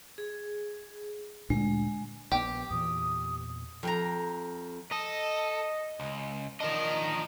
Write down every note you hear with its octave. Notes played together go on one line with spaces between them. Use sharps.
G#4
D2 A#2 G#3 D4
A#1 B3 G4
E2 A#2 E3 D#6
F2 G5 A#5
A4 D#5
C#2
F3 D4 A#4 D#5